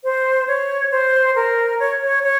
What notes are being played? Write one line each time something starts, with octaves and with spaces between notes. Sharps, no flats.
C5
C#5
C5
A#4
C#5
C#5
C#5